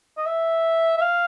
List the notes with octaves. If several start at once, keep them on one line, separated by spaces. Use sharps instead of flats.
D#5
E5
E5
F5